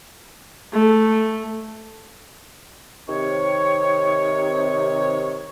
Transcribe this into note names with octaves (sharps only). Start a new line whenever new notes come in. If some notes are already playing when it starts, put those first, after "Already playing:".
A3
C3 D#3 C#5